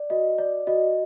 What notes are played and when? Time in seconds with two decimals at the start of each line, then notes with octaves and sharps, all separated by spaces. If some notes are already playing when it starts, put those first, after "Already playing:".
Already playing: D5
0.10 F#4 D#5
0.38 D5
0.67 F#4 D#5